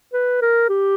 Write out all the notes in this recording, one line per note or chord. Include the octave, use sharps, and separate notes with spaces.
B4
A#4
G4